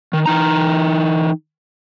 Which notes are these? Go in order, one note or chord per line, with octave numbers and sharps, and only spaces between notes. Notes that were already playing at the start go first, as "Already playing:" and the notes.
D#3
E3 D#4 A#5